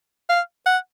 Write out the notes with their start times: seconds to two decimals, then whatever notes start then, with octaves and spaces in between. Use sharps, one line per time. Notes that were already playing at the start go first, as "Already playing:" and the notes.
0.29 F5
0.66 F#5